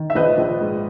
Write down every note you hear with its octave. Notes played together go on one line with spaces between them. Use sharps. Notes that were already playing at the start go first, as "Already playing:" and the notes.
Already playing: D#3
E5
A#1 B4 D#5
A#1
G#2